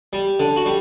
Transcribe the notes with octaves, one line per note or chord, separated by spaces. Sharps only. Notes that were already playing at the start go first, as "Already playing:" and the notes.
G3
D3
F#4
G3